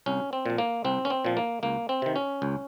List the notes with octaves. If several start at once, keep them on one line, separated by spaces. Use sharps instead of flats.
C2 C#4
C4
A#2 F3
A#3
C2 C4
C#4
C4
A#2 F3
A#3
C#2 A#3
C4
C3 D#3
C#4
C#2